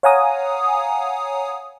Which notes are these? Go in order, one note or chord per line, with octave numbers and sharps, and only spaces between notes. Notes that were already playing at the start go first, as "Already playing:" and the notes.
C#5 F5 F#5 G#5 A#5 D#6